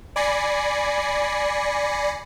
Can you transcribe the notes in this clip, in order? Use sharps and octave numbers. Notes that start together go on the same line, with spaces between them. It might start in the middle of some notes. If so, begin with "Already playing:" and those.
D5 G#5 B5 A#6 C7 C#7